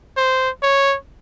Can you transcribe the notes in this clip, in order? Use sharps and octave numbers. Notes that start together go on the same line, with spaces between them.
C5
C#5